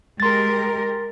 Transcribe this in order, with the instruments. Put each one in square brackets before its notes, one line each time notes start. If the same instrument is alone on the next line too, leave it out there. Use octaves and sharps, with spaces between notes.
[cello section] G#3 G4 A#4 [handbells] C6 A6